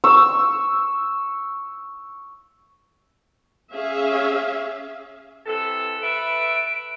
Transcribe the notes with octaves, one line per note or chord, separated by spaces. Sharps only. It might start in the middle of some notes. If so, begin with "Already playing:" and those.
C#6 E6
C#4 G#4 E5 F5
C3 E3 A4
A4 B4 E5 D7